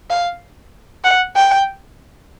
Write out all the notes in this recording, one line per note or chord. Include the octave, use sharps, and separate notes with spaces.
F5
F#5
G5